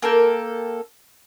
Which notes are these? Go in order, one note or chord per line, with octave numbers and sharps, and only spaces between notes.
A#3 A4 A#4 G5